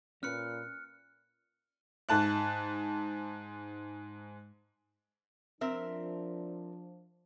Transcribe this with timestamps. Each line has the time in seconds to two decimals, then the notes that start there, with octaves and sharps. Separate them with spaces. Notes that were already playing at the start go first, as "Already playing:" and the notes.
0.23 A#2 C#4 B4 F6 F#6 C#7
2.09 G#2 A5 F#6
5.61 F3 C4 D4 A#4 E5